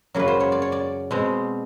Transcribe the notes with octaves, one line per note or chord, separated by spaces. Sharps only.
F#2 C#3 F#3 A#3 B4
C5
C#5
D5
C#5
D5
B2 G#3 C4